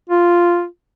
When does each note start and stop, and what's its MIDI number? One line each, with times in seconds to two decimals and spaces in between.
0.10 0.65 65